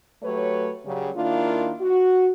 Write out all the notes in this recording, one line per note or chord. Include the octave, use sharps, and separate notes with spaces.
F#3 A3 G4 B4 C#5
C#3 F#3 G3
D#3 A#3 D4 E4 F4
F#4